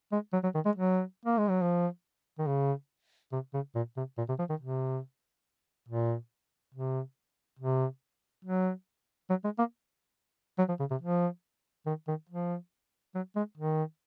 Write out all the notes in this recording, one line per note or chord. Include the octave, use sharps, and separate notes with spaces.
G#3
F#3
F#3
D#3
G#3
F#3
A#3
G#3
F#3
F3
D#3
C#3
C3
C#3
A#2
C3
A#2
C3
F3
D#3
C3
A#2
C3
C3
F#3
F#3
G#3
A#3
F#3
F3
C#3
C3
F3
D#3
D#3
F3
F#3
G#3
D#3